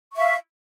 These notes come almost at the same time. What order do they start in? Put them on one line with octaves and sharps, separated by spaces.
C#6 E5 F5